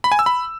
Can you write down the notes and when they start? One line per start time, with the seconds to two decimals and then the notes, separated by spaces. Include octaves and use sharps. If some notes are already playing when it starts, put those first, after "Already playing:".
0.04 B5
0.12 G#5
0.19 E6
0.26 B5